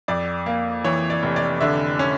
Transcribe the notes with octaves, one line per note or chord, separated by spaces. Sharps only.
F2 D5
A#3
E3 C#5
D5
F1
D5
D3 E5
C#4